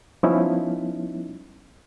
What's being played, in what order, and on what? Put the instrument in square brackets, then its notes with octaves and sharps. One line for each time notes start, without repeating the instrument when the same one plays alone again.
[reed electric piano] F3 G3 B3 C#4 D#4 E4